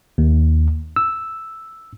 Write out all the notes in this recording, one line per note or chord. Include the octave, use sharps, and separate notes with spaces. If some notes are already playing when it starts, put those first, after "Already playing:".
D#2
E6